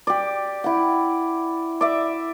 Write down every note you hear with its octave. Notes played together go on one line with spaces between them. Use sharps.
G4 D5
E4 F#5
D5 E5